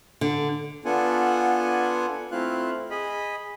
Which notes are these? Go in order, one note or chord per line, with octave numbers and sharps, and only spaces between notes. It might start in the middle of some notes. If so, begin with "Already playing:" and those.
D3
B3 D4 F4 A4 F#5 G#5
A3 C4 E4 F4 F5 F#6
G#4 D#5 B5